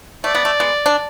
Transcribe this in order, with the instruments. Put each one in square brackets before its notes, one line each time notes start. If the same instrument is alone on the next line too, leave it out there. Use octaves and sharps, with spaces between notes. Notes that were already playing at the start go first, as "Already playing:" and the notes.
[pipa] A3 [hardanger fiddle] D5
[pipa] B3
A3
G#3 B3
D4